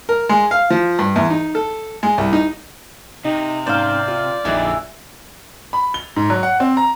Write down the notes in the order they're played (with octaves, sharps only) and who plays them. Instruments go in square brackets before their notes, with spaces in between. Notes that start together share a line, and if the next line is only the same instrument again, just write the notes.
[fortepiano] A#4
G#3
F5
F3
G2
E2
D#4
A4
G#3
C2
D#4
[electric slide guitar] C3 [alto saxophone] D#4
[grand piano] G#2 C#4 [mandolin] C5 F5 [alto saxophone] D5
[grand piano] F4
[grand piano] A#1 D#4 F#6 [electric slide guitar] F2 D3 C4 [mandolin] E4 G#4
[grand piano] B5
G7
G#2
F#3
F#5
C4
A#5